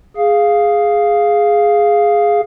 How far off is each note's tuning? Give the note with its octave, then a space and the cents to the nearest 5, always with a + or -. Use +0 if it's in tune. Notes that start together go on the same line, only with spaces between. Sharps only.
G#4 +0 F5 +0